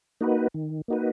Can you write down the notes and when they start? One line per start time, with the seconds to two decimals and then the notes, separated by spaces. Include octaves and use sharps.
0.21 A#3 D#4 F#4 B4
0.54 D#3
0.88 A#3 D#4 F#4 B4